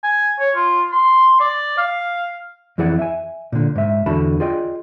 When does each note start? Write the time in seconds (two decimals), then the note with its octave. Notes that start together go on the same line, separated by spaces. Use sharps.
0.04 G#5
0.40 C#5
0.56 F4
0.92 C6
1.40 D5
1.78 F5
2.78 F2 E3 E4 G#4 D5 F#5
2.99 E5 G#5
3.52 A#2 D3
3.76 G#2 E5
4.06 E2 D3 F#4 A5 B5
4.40 F4 G#4 D5 D#5 G5